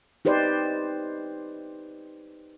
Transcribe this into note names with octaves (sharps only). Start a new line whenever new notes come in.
D#4 G4 B4 C5 D5